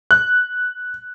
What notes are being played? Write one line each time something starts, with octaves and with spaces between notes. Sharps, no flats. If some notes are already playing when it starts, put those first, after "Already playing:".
F#6